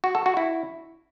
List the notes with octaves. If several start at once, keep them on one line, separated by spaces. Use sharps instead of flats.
F#4
A4
F#4
E4